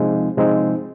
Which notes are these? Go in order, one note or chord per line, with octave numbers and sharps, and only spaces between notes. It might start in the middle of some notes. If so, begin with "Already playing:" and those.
Already playing: C3 F3 G#3 C4 D#4
C3 F3 G#3 C4 D#4